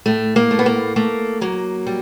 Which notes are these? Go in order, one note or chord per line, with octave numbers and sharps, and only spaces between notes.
A2 A3
A#3
A3
B3
A#3
A3 A#3
F#3 A#3
G3